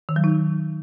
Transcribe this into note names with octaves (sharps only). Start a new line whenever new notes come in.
D#3
F#3
D#4